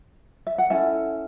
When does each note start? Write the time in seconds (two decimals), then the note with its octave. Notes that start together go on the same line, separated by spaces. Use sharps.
0.47 E5
0.58 F#5
0.70 C#4 E4 A4 E5 G#5